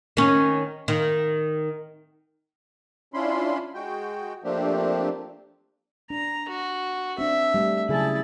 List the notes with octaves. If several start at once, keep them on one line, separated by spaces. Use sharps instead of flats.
D#3 C#4
D#3
C#4 D4 E4 F4 B5 C6
G#3 F#4 G5
F3 A3 A#3 C4 D4 G4
D4 A#5
F#4
C4 D4 E5
G3 A3
C#3 F#3 E4 G#4 A5